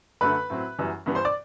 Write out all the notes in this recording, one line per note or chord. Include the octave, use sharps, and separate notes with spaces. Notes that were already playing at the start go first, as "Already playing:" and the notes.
F#2 D3 A3 B4 B5
A2 F#3 C4
F#2 E3 G3 B3
G2 E3 G3 B3
C5 C6
D5 D6